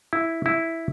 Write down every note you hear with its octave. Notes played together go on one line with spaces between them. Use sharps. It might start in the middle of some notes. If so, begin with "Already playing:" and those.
E4
E4